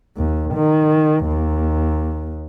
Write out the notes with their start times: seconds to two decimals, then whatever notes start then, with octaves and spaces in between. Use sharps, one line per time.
0.17 D#2
0.54 D#3
1.26 D#2